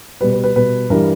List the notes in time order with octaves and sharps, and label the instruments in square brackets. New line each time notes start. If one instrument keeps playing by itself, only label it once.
[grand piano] B2 G3 B4
B4
B4
B2 G3 B4
G2 E3 G3 A#4